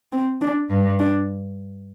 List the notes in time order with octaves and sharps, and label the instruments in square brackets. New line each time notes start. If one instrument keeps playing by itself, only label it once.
[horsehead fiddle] C4
D4
[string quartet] G2
[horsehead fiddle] D4